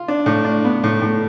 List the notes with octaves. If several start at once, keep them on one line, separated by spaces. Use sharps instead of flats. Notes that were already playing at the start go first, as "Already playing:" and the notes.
Already playing: F4
D4
A2
D4
B3
A2
A2